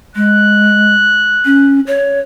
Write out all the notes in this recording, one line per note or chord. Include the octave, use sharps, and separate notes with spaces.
G#3 F#6
C#4
C#5